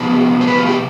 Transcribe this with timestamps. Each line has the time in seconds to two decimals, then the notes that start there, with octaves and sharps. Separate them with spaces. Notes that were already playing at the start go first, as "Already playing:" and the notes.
Already playing: C3 F3 B3 E4 C5
0.41 C5
0.47 B4
0.56 F4
0.66 G4